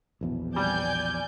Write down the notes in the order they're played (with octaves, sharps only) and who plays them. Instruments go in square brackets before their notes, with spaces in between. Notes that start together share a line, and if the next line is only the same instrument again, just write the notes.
[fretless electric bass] A#1 E2 B2
[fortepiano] G3 [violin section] D5 G#5 G6